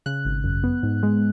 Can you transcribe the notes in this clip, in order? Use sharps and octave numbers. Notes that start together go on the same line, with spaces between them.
C#3 F#6
G#1
F#2
B3
G#2
G#3